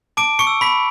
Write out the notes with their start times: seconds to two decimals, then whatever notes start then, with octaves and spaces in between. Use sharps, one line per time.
0.17 A5 D6 D7
0.39 C#6 C#7
0.47 E6
0.61 B5 B6